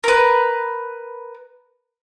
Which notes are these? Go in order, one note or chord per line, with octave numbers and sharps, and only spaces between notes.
A#4 B4